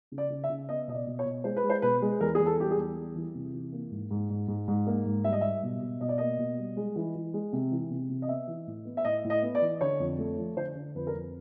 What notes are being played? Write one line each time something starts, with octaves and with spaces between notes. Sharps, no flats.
C#3
D5
C#3
E5
C#3
B3 D#5
B2 D#5
D5
B2
C#5
B2
G#3 C5
B4
G#3
C5
B2 B4
G#3
E2 A#4
E2 G#4
A4
G3 G4
G#4
E2
G3
E3
C3
E3
A#3
G#2
G#2
G#2
G#2
G#2
A#3
G#2
G3 E5
D#5
G3 E5
B2
B2
B2 D#5
D5
A#3 D#5
B2
G3
G#3
E3
E3
G#3
C3
E3
C3
C3
D#5
B3 E5
E3
A2
B3
E5
A2 D#5
A2
D#5
B3
D5
E3
D3 C#5
F2
A3
F3
D3 C5
D3
F2 B4
A#4
F2